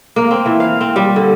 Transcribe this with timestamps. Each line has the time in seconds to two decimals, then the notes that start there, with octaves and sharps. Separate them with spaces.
0.16 A#3
0.31 C4
0.46 E3
0.60 F5
0.81 C4
0.96 G3
1.16 D3